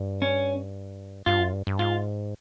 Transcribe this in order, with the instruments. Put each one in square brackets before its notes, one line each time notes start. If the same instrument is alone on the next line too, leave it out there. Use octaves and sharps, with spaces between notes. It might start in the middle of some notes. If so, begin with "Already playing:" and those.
Already playing: [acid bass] G2
[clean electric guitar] C#4
[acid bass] G2 [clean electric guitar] F4
[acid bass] F#2
G2
G2
[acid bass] G#2 [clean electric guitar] F4